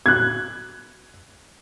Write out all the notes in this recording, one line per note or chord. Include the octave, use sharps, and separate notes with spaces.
F#6 G#6